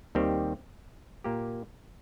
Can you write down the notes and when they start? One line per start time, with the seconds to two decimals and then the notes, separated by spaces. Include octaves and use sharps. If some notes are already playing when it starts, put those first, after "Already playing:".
0.15 D#2 D#3 G3 C4 G4
1.24 A#2 A#3 G4